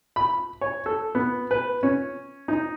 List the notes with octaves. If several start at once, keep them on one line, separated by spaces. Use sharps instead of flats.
B5
C#5
A4
B3
B4
C#4
D#4